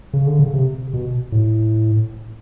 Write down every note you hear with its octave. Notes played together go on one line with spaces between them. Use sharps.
C#3
D3
C#3
C3
B2
A2